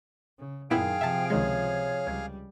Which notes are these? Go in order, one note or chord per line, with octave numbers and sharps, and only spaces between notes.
C#3
F#2 A#2 D#3 B3 E4 G#4 F5 G5
C3 F3 E5 A5
C#2 D#3 G#3 C#5
C#2 G3